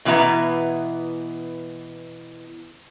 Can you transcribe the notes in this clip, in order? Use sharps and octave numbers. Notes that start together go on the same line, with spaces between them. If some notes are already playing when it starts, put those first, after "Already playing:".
B2 E3 B3 E4 A#5